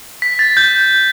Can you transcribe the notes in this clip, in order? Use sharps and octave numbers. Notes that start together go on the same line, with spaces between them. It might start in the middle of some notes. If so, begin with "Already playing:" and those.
B6
A6
G6